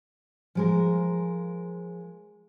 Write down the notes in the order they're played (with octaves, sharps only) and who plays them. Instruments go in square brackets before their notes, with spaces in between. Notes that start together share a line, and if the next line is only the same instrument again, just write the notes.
[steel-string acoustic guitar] F3 G#3 A#4